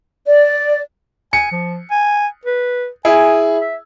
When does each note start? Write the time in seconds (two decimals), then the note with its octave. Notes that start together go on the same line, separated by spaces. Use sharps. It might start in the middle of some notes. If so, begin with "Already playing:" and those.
0.26 D5
1.33 G#5 C#7
1.52 F3
1.91 G#5
2.45 B4
3.05 E4 G#4 G#5
3.60 E5